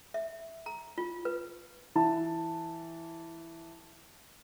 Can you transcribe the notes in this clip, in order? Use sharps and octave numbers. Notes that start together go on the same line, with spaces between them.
E5
A#5
F4
B4
E3 A5